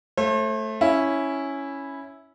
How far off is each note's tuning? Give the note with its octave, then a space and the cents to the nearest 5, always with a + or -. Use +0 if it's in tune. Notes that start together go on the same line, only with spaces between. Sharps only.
A3 +0 C5 +45
C#4 +0 E4 -5